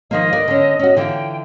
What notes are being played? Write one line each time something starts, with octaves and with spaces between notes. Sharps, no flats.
D#3 F3 A#3 D#5
A#4 B4 D5
D3 C#4
C#4 F#4
D3 E3 F4 G5